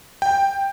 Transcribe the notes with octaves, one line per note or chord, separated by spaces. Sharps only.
G5